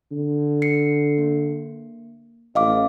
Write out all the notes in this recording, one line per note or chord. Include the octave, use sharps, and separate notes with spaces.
D3
C7 C#7
A#3
A1 D#5 F5 D6